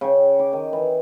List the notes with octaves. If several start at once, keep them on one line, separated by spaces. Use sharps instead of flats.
C#3 G5
D6
D#3
E3